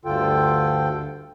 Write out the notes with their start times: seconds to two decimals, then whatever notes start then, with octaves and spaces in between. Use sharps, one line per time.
0.05 D2 G2 D3 F4 A4 G5